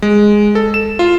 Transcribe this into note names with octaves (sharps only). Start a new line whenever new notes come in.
G#3
A4
E7
F4